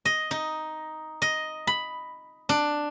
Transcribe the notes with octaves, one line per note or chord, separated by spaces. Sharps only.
D#5
D#4
D#5
B5
D4